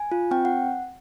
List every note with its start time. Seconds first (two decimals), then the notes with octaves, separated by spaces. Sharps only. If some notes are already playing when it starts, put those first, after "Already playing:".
Already playing: G#5
0.12 F4
0.31 C4 G5
0.45 F#5